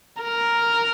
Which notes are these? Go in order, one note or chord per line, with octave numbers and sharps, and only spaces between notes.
A#4